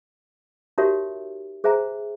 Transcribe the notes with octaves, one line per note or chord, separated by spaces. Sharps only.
D#4 F#4 G4 A#4 C#5 E5
G#4 C5 E5 G#5 A#5